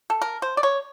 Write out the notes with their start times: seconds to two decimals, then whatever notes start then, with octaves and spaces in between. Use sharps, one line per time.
0.10 A4
0.22 A#4
0.42 C5
0.57 D5
0.63 C#5